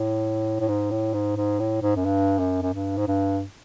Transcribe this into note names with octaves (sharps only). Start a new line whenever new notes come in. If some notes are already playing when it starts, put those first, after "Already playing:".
Already playing: A2
A2
G#2
A2
G#2
G#2
A2
G#2
F#2
G2
F#2
F#2
G2
G#2
G2